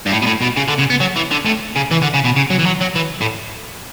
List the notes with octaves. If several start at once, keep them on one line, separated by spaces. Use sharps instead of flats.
G2
A2
B2
A2
B2
C#3
D3
C#3
B3
F#3
E3
D3
A2
C#3
E3
D3
C#3
B2
C#3
F#3
E3
F#3
F#3
E3
A2